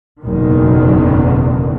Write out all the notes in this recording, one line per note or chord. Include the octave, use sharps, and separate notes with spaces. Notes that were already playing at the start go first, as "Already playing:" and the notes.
F#1 E2 B2 D3 D#3